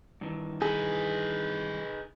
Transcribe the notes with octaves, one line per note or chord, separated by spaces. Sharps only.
G2 D#3 E3
D#4 G#4 B4